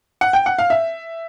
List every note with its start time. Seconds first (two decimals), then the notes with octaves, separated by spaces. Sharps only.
0.21 F#5
0.33 G5
0.46 F#5
0.58 F5
0.70 E5